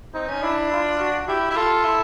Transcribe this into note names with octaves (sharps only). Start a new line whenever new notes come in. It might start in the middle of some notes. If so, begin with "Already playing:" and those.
C4 D#4
C#4
D4 E4
F4
F#4
E4 G4
E4
F4 A4
E4